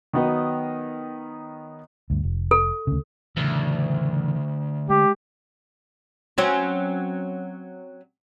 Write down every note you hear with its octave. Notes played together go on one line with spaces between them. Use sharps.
D#3 F#3 B3 D#4 D#5
D2 G2
F1
A4
D2 C#3
D2 C#3 E3
G#3 G4
F#3 C4 C#4